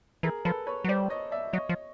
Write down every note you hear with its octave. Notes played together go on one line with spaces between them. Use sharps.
E3 G#4 A#4
F3 A4 B4
B4 C#5
F#3
G3 C5 D5
C#5 D#5
D5 E5
F#3 C#5 D#5
F3